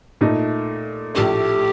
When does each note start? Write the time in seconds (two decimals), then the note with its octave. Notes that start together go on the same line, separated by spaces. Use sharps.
0.21 A#2 A3 D#4
1.15 A#1 A2 A3 G4